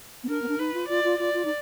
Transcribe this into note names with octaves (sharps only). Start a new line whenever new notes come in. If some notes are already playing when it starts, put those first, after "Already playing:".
B3
D4 A#4
B3
D4
D#4 B4
F4
F4 D5
F4
F4 D5
F4
D#4